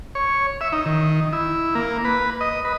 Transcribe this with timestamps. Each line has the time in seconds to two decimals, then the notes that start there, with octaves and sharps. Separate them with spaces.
0.15 C#5
0.61 E5
0.73 D#4
0.86 D#3
1.33 E4
1.75 A#3
2.05 B4
2.41 D#5
2.65 B4